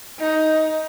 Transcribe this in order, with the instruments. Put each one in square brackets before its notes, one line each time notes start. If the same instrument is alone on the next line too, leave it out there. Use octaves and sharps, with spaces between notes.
[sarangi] D#4